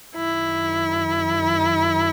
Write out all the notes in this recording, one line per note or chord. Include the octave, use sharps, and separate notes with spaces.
F#2 D#3 E4